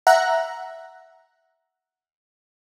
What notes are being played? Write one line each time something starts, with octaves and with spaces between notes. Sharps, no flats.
E5 F#5 A#5 F#6